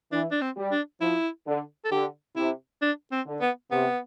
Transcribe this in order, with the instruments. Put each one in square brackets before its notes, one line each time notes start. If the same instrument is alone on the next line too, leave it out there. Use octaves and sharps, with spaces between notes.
[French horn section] E3 [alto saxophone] D4
[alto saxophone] D4
C4
[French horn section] G3
[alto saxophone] D4
[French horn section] F3 [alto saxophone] E4
[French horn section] D3
[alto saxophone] A4
[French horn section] D3 [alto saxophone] G4
[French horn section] C3 [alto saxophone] E4
[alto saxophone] D4
C4
[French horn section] D3
[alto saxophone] B3
[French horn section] C3 [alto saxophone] B3